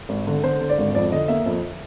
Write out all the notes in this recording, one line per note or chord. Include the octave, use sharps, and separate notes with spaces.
G#1
D3
D3 C5
D3
D5
G#1
F2 D5
D3 D#5
A#3 E5
F2